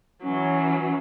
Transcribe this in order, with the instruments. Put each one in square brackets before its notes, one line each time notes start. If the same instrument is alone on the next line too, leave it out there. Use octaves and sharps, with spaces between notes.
[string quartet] E3 F#3 [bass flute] C#4